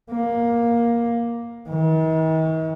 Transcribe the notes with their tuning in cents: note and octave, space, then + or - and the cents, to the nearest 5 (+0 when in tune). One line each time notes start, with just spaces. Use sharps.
A#3 +10
D#3 +45